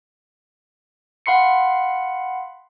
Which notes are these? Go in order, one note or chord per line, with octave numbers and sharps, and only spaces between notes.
F5 F#5 B5 C6 C7 C#7